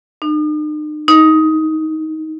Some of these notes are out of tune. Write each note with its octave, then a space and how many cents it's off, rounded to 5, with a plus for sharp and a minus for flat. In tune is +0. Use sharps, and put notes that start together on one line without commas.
D#4 -45
D#4 +15